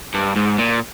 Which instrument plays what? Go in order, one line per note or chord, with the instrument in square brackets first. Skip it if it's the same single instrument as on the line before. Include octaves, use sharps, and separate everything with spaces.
[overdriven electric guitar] G2
G#2
A#2